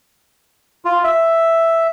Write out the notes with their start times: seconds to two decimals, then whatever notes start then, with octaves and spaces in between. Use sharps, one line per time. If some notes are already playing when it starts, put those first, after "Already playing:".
0.85 F4
1.04 E5